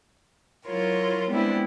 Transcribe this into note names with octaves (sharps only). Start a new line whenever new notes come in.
F#3 E4 F4 A#4 C#5
G3 G#3 B3 C4 D4 E4